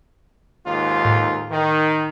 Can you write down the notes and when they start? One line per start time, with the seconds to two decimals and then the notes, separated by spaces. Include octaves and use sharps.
0.65 D#2 G#2 F4
1.05 A2
1.49 D#3